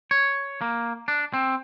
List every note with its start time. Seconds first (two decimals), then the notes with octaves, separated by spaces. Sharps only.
0.11 C#5
0.61 A#3
1.08 D4
1.34 C4